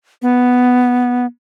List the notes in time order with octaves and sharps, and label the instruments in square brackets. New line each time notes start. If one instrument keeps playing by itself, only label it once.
[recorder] B3